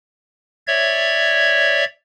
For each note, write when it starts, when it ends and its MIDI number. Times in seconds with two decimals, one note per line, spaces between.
0.67 1.84 73
0.67 1.84 74
0.67 1.84 76
0.67 1.84 92